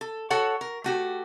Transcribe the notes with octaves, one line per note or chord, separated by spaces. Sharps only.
A4
F#4 A4 C#5 F#5
A#4
A3 F#4 G4